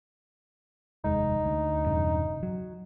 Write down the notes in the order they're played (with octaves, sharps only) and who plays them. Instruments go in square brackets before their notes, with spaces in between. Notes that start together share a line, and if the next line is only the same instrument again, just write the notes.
[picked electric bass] F1 D#2 G#3 [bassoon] D#4
[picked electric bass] D2
E1 G2 C#3
F#3